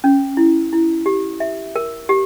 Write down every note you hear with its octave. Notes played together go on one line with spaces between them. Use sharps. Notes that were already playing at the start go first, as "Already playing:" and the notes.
C#4
E4
E4
G4
E5
A#4
G4